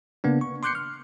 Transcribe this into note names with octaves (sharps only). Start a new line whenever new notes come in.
C#3 A#3 B3 D4
C#6
C6 D6 F#6 G6 C7 C#7
F6